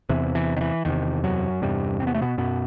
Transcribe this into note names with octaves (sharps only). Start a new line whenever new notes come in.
E2 C3 E3
E3
D#3
E3
E2 C3 D#3
F#2 F#3
E2 G2 C3 G3
C4
B3
A3
B2 B3
F#2 B2 B3